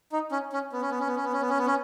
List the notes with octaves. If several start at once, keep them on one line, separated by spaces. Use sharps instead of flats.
D#4
C#4
C#4
B3
C#4
B3
C#4
B3
C#4
B3
C#4
B3
C#4
B3
C#4